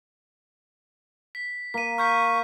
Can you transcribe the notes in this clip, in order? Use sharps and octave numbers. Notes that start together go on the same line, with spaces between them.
B6
A#3 B6 D#7
C#6 F6 G6 B6